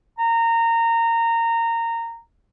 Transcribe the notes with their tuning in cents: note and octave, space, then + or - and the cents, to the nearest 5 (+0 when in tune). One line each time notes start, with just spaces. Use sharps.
A#5 -20